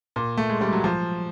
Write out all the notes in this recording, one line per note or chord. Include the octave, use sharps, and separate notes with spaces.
A#2
A3
G#3
G3
F#3
F3